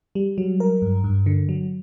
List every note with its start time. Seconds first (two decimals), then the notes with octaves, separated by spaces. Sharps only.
0.15 G3
0.38 F#3
0.60 A#4
0.82 G2
1.04 G2
1.26 D3
1.49 F#3